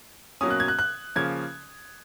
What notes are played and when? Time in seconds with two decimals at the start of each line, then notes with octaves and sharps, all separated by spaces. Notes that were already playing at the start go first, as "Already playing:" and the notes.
0.41 B2 F#3 A#3 C#4 D#6
0.50 F#6
0.60 G#6
0.68 F#6
0.79 F#6
1.16 C#3 F3 A#3 C#4 G#6